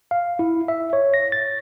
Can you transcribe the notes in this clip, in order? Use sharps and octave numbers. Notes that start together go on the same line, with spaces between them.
F5
E4
E5
C#5
A#6
A6